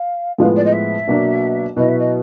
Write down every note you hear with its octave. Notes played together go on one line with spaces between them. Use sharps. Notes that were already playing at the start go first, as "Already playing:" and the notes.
Already playing: F5
A2 F3 G#3 B3 F5
D5
D#5
E5
B2 F#3 A#3 D4
B2 F#3 B3 E4 D#5
E5
D#5